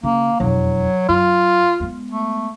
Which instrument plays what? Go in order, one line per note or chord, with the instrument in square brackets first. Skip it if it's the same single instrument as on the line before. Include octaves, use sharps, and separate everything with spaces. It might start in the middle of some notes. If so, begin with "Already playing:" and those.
[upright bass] C#3 [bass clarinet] A#3
[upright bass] E1 F2 [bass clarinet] F#3
[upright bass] F#2 [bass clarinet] F4
[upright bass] G#3 B3
[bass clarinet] A3